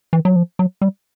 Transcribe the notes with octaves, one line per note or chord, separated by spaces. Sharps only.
E3
F#3
F3
F#3
G3